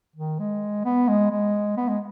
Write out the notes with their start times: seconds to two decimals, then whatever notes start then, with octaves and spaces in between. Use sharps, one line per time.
0.16 D#3
0.39 G#3
0.85 B3
1.08 G#3
1.31 G#3
1.77 B3
1.88 G#3